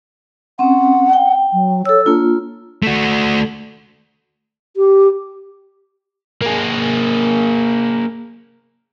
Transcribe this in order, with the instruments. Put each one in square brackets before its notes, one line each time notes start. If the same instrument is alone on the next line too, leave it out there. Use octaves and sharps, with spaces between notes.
[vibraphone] C4 C#4 [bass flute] F#5
[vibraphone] G5
[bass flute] F#3
[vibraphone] A4 E6 [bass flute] C#5
[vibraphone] A#3 F4 [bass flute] D4
[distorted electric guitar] A3 F#4
[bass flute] G4
[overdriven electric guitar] A#3 G#4